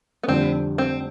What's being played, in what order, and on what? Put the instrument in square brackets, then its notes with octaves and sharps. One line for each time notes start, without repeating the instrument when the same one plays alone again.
[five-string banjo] B3
[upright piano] F1 F2 D3 G3 D4 [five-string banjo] C4
[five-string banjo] C4